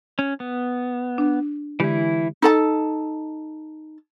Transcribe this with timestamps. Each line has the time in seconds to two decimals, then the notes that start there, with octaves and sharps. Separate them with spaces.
0.19 C#4
0.40 B3
1.18 D4
1.80 D3 E3 G#3 E4 G4
2.42 D#4 A4 A5